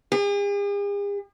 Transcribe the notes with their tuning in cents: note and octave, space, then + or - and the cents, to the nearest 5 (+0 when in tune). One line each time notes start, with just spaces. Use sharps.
G#4 -45